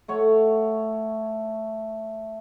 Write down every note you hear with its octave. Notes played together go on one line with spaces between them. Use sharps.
A3 C#5 F#5